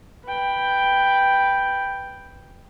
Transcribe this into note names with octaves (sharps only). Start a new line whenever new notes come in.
B4 G5